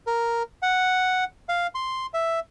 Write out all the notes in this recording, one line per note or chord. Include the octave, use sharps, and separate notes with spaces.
A#4
F#5
F5
C6
E5